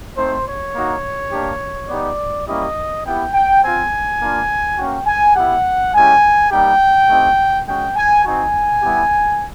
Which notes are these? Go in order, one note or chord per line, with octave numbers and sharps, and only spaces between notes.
A3 C4 D#4 C5
C#5
A#3 D#4 F#4
A#3 D4 G4
B3 D#4 G4 D5
G3 A#3 C#4 E4 G4 D#5
B3 E4 G4 G5
G5
C4 F4 G#5
A#3 D4 F4
A#3 C#4 F#4 G5
G#5
B3 E4 G4 F#5
G#3 C#4 E4 G4 G#5
G3 A#3 D#4 G4 G5
A3 C4 D#4 G4
G#3 C#4 F#4 G5
G#5
C4 D#4 F#4 G#5
G3 B3 E4 G4